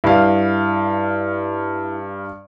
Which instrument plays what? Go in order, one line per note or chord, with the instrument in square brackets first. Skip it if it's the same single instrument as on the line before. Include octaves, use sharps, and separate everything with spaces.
[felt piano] G2 F5 [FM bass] E4